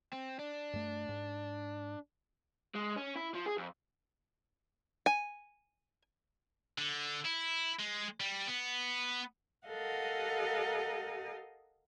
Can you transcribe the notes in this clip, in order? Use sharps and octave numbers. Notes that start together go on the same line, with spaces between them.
C4
D4
G2 A3
G#2
G#3
C#4
E4
F3
G#4
F2
G#5
D3
E4
G#3
G3
B3
G4 A4 A#4 D#5 F5 F#5